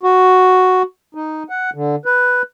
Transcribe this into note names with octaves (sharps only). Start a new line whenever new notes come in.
F#4
D#4
F#5
D3
B4